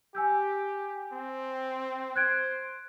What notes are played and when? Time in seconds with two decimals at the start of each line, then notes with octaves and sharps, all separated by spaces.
0.15 G4 G#5 E6 G6
1.13 C4
2.16 C5 F#6 G#6 D7